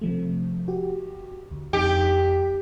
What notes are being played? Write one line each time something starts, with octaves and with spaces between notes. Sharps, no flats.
C3 F3 A3
F#4 G4
D2
F2 D#4 G4 B6